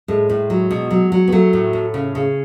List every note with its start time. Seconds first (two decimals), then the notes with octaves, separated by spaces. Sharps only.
0.08 A2 G#3
0.30 A2
0.50 F#3
0.71 B2
0.91 F#3
1.12 F#3
1.28 B3
1.32 F#3 A3
1.53 A2
1.73 A2
1.94 C#3
2.15 C#3